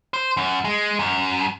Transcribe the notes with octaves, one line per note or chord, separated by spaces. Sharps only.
C5
F#2
G#3
F#2